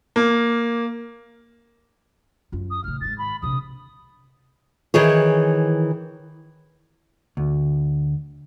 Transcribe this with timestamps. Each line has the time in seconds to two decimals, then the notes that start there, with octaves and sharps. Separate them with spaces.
0.16 A#3
2.52 F#2 F4
2.71 D#6
2.84 A2 C#3 F6
3.01 G#2 D#3 A6
3.18 B5
3.42 A#1 C3 D#6
4.94 D#3 E3 G#4 C#5
7.37 D2